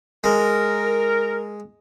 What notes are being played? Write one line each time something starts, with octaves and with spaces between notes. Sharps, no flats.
G#3 A#4